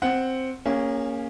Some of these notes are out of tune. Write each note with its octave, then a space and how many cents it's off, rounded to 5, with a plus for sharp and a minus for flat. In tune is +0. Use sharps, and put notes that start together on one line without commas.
C4 +0 F#5 +0
A#3 +0 C#4 +0 G#4 -30